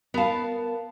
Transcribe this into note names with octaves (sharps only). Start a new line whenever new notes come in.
B3 A#4 F5 A5